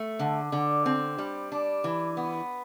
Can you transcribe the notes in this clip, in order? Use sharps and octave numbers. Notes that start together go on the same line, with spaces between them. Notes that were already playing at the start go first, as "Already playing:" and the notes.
Already playing: A3
D3
D3
C4
G3
D4
E3
B3